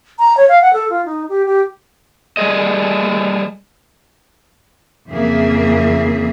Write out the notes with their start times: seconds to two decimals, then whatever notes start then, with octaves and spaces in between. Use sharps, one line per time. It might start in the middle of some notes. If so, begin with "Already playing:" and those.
0.19 A#5
0.37 C#5
0.49 F5
0.61 F#5
0.73 A4
0.90 F4
1.05 D#4
1.29 G4
1.46 G4
2.37 G3 A3 G#4 D#5
5.09 F2 C#3 E3 A#3 G#4 E5